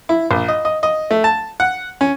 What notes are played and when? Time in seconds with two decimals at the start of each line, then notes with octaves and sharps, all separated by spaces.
0.09 E4
0.31 A#1
0.48 D#5
0.65 D#5
0.83 D#5
1.11 A3
1.24 A5
1.60 F#5
2.01 C#4